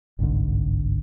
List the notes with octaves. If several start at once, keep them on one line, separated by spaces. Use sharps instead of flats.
G1 C2 G#2 D3